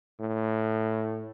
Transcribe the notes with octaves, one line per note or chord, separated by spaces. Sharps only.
A2